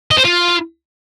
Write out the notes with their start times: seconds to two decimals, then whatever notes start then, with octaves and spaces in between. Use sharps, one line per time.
0.11 D#5
0.18 C5
0.25 F4